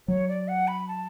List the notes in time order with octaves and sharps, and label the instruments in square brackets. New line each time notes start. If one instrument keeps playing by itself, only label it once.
[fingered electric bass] F#3 [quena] C#5
[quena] D5
F#5
B5
A5